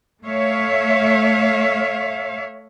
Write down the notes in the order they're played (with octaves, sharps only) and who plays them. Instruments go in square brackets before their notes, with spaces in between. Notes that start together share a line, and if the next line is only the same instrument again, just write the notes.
[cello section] A3 C#5 E5 F5